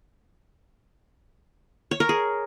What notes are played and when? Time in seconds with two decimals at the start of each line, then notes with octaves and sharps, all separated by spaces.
1.91 C#5
2.00 A#4
2.09 G#4